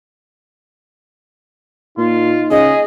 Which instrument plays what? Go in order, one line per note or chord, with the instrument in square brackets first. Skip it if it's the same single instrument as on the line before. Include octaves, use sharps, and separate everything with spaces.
[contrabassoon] A#2 [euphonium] D#4 [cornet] F4
[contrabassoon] C#3 [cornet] G#4 [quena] D#5